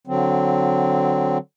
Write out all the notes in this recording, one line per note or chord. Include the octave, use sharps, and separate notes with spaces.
D3 F#3 C4